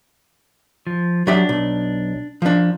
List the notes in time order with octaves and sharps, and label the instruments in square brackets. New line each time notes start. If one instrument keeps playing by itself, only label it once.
[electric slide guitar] F3
[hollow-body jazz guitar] F#3 G4 E5 [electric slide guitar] D4
[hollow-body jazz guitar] B1
F3 D4